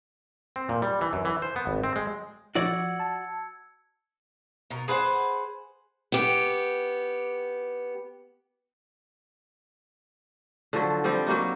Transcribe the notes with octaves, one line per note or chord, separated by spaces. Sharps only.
C4
A#2
G3
E3
F#2
E3
C5
B3
G#1
C4
G#3
F3 F#4 D5 E6 G#6 C#7
A5
B2 A#4
G#4 B4 C5 F#5
B3 G4
D3 F3 F#3
F3 G3 C4
F#3 G3 A#3 D#4